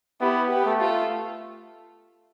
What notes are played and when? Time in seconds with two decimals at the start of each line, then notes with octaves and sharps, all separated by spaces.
0.21 B3 E4 G4
0.51 G4 B4
0.66 A3
0.81 F4 A4